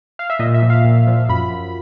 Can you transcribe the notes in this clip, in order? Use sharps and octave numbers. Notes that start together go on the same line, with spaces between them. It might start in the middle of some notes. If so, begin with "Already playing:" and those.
F5
E5
A#2 D#5
E5
F3
F5
A#2
F3
F#2 B5
F#2